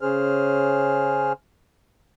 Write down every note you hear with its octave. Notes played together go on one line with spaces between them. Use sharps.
C#3 C#4 G#4 C5 F6